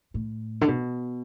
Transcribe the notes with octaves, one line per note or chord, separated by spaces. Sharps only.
A2
D3
B2